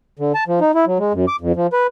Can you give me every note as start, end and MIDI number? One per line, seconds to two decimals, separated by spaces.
0.19 0.32 50
0.35 0.44 81
0.48 0.60 53
0.61 0.72 63
0.75 0.85 64
0.87 0.98 54
0.99 1.13 56
1.14 1.25 42
1.28 1.36 86
1.41 1.52 41
1.56 1.67 53
1.73 1.87 71